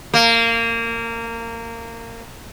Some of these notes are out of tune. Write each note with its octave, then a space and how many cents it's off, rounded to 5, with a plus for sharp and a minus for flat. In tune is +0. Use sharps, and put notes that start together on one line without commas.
A#3 -20